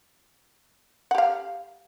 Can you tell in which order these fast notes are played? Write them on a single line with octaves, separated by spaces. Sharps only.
F#5 G4 F5